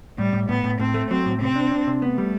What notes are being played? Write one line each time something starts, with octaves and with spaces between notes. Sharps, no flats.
A2 G3
A2
A2 B3
A2
A2 C4
A3
F#3 C4
A2
C3 C4
D4
D4
C3
A3 B3
G3